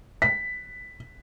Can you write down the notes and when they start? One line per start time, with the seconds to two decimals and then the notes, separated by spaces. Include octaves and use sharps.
0.22 B6